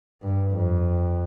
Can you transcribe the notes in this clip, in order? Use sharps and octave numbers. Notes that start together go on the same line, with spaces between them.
G2
F2